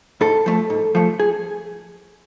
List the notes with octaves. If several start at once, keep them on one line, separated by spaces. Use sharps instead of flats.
G#2 A4
F3 A3
G#2
F3 A3
G#4